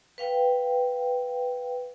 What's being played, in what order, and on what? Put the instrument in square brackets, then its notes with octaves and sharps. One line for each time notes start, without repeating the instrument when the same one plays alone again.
[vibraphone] B4 F5 G5